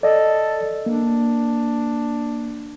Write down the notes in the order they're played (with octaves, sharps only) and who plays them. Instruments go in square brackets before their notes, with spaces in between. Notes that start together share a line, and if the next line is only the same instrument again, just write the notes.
[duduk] A4 [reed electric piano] D5 D#5
[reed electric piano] A#3 [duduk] D4